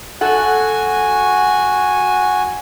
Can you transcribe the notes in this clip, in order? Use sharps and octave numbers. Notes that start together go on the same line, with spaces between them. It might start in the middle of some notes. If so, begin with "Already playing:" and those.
F#4 A4 F#5 G#5